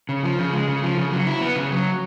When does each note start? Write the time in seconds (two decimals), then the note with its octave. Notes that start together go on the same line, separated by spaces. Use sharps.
0.09 C#3
0.23 F3
0.39 C#3
0.53 G#3
0.68 C#3
0.83 F3
0.97 C#3
1.12 F#3
1.27 E4
1.41 B3
1.56 C#3
1.71 F#3